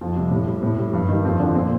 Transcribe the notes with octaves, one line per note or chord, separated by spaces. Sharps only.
F2
C3 G3
A2
G3
A2
G3
G2
D#3 G3
F2 C4
D3 F3 D4
A#2 C4